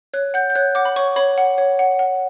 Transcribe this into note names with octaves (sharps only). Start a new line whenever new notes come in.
C#5 F#6
F#5 G6
G6
C#5 F#6
F#5 D6
B5
C#5 C#6
C#5 B5
F#5
C#5
F#5
F#5